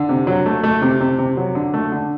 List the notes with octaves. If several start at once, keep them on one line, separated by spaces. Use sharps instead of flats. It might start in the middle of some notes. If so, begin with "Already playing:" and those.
Already playing: D3
C3
F#3
A3
A3
C3
C3
C3
F#3
D3
A3
D3